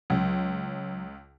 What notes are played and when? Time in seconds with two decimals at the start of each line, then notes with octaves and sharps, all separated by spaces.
0.10 C#2 F#3